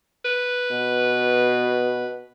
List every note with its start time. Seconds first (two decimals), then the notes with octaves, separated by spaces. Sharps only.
0.25 B4
0.71 B2